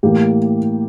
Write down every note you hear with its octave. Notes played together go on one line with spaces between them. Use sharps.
A2 E3 A#3 G4